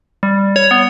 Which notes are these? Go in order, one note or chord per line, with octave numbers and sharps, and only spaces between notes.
G3
C#5
B3